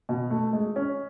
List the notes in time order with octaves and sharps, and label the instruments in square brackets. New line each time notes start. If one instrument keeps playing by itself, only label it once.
[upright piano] B2
A3
G#3
C#4